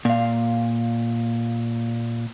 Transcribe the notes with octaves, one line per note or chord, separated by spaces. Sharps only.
A#2 F5